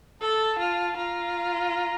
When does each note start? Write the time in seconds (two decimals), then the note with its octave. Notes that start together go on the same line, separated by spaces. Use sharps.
0.22 A4 A5
0.59 F4
0.96 F4 A#5